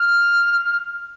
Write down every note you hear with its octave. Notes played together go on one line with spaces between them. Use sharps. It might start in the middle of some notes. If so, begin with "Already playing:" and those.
Already playing: F6